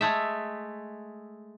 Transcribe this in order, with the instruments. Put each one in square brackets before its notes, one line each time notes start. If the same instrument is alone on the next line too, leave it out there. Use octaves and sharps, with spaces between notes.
[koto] G#3 A3 E5